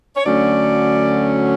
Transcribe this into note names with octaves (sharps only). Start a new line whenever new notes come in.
C#5
D2 D3 F#3 A3 C#4 D5